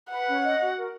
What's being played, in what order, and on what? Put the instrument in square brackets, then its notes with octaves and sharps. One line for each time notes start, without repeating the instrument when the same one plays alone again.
[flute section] B4 [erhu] F#5
[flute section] C#4
D#5
F#4
A#4